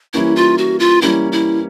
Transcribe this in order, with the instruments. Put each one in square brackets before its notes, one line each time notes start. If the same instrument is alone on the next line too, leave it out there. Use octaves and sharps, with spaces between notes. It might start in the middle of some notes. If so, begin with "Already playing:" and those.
[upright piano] E3 G3 A#3 C#4 [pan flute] E4
[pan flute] F4
F#4
F4
[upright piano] E3 G3 A#3 C#4 [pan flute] E4
[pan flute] E4